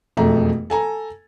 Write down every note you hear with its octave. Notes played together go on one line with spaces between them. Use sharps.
E1 F2 A3 A#5
A4 G#5 A#5